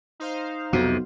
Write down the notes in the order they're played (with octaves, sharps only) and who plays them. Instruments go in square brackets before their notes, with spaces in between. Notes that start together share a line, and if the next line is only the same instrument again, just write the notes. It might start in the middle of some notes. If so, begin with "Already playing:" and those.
[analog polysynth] D#4 C5 F5
[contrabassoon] B1 [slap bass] F2 C3 [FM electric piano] F#4